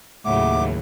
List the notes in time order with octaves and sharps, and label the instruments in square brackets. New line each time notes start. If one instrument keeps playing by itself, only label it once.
[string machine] D#2 [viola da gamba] A2 C#3 F#3 [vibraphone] E5 F#5 [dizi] D6